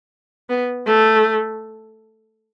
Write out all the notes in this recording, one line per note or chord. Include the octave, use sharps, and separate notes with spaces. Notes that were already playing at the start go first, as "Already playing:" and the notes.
B3
A3